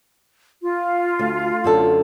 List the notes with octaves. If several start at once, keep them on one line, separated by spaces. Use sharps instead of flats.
F4
D2
F#2 D3 A4